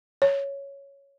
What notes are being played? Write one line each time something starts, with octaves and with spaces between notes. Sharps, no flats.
C#5